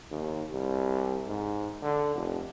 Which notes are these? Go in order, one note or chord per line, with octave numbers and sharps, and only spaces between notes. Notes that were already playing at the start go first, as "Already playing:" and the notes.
D#2
C2
G#2
D3
F1